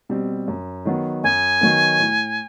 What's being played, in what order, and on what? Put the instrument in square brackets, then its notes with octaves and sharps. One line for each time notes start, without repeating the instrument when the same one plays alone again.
[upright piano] B2 G3 C4
F#2
D#3 F#3 B3
[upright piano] F#2 [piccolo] G#5
[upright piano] D#3 F#3 B3
A2